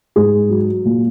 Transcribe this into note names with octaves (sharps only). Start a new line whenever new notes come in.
G#2 G#4
F#3
A#2